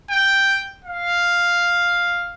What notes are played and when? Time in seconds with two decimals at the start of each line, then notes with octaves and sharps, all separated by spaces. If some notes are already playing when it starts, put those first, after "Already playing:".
0.11 G5
0.85 F5